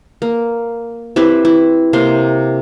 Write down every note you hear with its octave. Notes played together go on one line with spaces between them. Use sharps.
A#3
C4 E4 G4 B4
E4
C3 A#3 C6